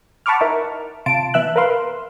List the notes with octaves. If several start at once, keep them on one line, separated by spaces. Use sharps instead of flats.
F#5 A5 B5 C#6 D6 F6
D#4 E4 A#4
C3 F4 A5 D7
B2 E3 E5 E6 F#6
A#4 B4 F5 C6